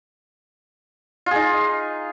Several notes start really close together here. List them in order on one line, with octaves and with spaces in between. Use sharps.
F4 G#4 D#4